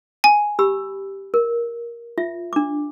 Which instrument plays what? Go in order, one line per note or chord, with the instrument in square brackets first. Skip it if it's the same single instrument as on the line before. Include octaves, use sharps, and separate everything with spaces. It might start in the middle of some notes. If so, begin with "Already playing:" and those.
[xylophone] G#5
[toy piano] G4 B5 E6
A#4
F4 E5
D4 D6